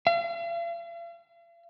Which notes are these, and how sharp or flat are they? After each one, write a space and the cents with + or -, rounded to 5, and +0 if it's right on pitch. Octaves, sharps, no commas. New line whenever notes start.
F5 -45